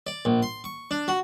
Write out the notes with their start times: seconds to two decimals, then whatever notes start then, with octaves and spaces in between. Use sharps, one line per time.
0.07 D5
0.25 A#1
0.43 C6
0.64 C#6
0.91 D4
1.08 F#4